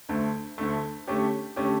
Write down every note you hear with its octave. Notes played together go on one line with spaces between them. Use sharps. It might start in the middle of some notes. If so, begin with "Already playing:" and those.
D2 D3 A3
D2 D3 A3
D3 A3 C#4 G4
D3 A3 C#4 G4